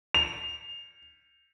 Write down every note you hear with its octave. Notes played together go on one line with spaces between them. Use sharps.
F7